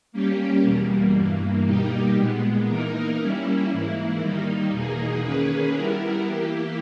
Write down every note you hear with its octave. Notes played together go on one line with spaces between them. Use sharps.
G3 A#3 C#4 G4
E2 B2 G3 A#3
G2 E3 A#3
B2 G3 A#3 D#4 G4
A#2 G#3 B3
E3 A#3 D#4 A#4
G3 A#3 C#4 E4
G#2 E3 A#3 E4
D#3 G3 A#3 D#4
E2 B2 A#3 D#4 G#4
D#3 A#3 C#4 G#4 B4
G3 B3 E4 A#4
E3 A#3 E4 G4